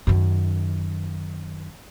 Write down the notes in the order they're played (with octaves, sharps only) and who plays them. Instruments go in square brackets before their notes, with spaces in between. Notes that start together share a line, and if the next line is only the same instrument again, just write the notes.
[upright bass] F#2 D#3